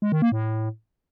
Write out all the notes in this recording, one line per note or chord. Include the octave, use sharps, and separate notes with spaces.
G#3
D#3
A#3
A2